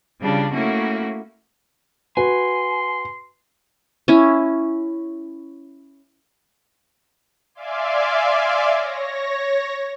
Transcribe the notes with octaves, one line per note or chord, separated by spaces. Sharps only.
C#3 G3 D4 F4
A3 A#3 C#4 E4 F#4
F#4 B4 G#5 C6
C#4 E4
D5 E5 F5 G#5 C6 D6
C#5 A#6